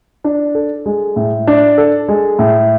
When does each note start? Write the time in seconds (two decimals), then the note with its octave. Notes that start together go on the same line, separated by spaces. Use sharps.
0.24 D4
0.55 A4
0.86 G#3
1.16 A2
1.47 D4
1.78 A4
2.08 G#3
2.39 A2